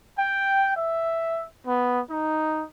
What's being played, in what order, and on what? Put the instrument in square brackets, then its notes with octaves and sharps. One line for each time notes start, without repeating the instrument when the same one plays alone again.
[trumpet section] G5
E5
B3
D#4